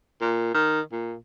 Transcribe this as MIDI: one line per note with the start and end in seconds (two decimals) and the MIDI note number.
0.21 0.52 46
0.54 0.80 51
0.92 1.14 46